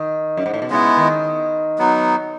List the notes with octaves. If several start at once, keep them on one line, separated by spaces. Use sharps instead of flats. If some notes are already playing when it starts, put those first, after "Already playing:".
Already playing: D#3
F#2
G#2
A2
B2
C#3 G#3 B3 E4
D#3
F#3 B3 D#4